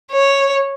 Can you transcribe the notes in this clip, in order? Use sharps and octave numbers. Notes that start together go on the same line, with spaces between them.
C#5